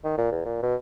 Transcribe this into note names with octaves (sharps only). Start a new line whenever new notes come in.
D#3
A#2
E2
A#2
B2